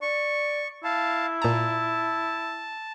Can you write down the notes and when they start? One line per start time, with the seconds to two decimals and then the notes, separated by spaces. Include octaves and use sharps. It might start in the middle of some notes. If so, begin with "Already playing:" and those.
0.02 D5 C#6
0.84 E4 F5 A5
1.42 A#2 A5 A#5